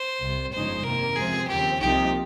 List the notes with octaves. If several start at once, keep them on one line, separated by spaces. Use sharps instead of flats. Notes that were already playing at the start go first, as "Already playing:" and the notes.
Already playing: C5
C2 C3 G3
G1 F2 C#3 G#3 D#4 C5
C3 D#3 A#3 A#4
C#2 C3 F3 C4 G#4
D#2 C#3 F3 C4 G4
C2 C3 F3 A#3 D#4 G4